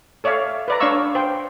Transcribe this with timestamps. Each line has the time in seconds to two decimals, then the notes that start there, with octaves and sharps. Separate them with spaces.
0.24 A4 C#5 D5 E5 F5
0.68 B4 D5 A#5
0.80 D4 C#5 D5 F5 C#6 E6
1.15 C5 G5